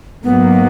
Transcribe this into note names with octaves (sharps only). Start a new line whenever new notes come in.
G#2 F#3 A#3 B3